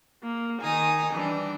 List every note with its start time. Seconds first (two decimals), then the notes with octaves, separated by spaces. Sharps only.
0.23 A#3
0.61 D#3 D#4 G#5 A#5 D#6
1.13 E3 G3 D4